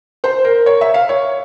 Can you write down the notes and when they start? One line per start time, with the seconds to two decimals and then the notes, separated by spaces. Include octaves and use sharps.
0.24 C5
0.45 A#4
0.66 C#5
0.81 E5
0.94 F5
1.09 C#5